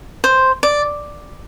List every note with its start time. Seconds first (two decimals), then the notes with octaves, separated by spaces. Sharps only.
0.24 C5
0.63 D5